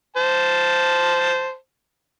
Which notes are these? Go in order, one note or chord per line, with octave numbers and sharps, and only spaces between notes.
C5 A5